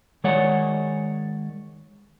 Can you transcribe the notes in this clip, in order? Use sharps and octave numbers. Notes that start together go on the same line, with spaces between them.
D#3 G#3 C#5 D5 F#5